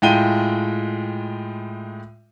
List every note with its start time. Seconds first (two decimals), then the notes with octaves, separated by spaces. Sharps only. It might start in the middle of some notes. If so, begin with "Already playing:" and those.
0.02 A2 G#3 F4 G5 D#7 G7